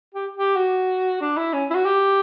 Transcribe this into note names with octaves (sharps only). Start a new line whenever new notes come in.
G4
G4
F#4
D4
E4
C#4
E4
F#4
G4